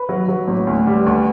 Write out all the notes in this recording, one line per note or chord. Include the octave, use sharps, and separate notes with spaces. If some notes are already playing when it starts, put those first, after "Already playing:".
Already playing: B4 B5
F#3
F#3
A1
D2
G3
D2